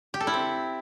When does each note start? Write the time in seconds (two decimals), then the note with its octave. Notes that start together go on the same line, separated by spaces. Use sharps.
0.14 G4
0.20 A4
0.27 E4
0.34 C4